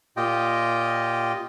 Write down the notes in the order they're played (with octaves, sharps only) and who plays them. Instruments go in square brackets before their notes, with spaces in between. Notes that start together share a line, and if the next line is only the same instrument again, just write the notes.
[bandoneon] A#2 F4 G4 D#5 G5